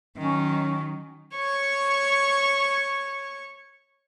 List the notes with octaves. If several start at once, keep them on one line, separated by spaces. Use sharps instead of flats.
D#3 F#3 C#4
C#5 C#6